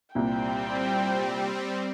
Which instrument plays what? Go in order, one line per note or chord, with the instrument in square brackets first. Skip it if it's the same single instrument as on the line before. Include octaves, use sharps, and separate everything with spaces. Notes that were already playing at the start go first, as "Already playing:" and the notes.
[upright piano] C2 A#2 [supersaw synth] G3 C4 [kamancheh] G5